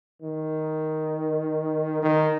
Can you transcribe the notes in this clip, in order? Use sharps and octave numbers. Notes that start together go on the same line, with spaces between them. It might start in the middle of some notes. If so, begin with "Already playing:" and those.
D#3
D#3